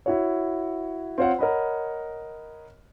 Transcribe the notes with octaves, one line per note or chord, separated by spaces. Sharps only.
E4 F#4 C#5
C4 F4 C5 C#5 F5 F#5
A#4 C#5 D#5 F#5 B5